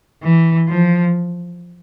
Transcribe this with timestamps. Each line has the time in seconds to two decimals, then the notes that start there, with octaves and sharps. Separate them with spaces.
0.23 E3
0.68 F3